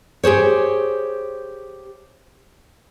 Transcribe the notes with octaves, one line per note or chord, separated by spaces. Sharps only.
G4 G#4 C5 C#5